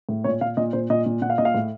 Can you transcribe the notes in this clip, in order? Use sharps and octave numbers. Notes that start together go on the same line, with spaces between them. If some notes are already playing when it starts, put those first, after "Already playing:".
A2
A#2 C#5
A#2 F5
A#2 D#5
A#2 C5
A#2 D#5
A#2
A#2 F#5
F5
A#2 D#5
F5
A2